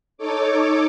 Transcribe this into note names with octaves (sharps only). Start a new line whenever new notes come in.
D#4 A4 C#5 D6